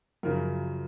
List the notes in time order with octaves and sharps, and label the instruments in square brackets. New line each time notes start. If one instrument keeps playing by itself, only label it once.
[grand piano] F#2 C#3 F3 A#4